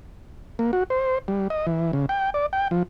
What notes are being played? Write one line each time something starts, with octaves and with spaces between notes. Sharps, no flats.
A#3
F#4
C5
G3
D#5
E3
C#3
G5
D5
G5
F3